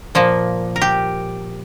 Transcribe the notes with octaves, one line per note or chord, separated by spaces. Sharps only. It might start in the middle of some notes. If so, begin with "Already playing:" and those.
A#2 F3 A#3
A#4
G4